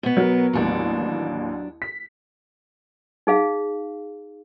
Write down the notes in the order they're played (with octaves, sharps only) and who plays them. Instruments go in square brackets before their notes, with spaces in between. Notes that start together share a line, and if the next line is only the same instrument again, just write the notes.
[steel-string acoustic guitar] B2 B3
[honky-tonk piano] F#3 A#4
[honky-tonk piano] A1 D#2 A2 [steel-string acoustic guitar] F#3 D4
[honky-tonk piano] B6
[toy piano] D#4 G#4 F5